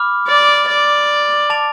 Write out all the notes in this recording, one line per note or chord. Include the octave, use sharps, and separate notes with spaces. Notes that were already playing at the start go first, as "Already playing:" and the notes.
Already playing: B5 D6 F6
D5
D5
A5 D6 A6 D7 F7